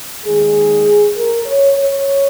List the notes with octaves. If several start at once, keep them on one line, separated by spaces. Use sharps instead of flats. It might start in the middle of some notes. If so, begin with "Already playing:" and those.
D#2 D#3 G#3 G#4
A#4
C#5
C#5